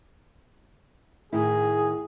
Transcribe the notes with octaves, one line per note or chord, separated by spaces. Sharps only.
A2 D#3 E4 G#4